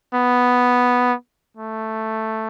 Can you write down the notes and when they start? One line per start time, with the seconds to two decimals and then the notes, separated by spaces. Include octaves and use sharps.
0.13 B3
1.57 A3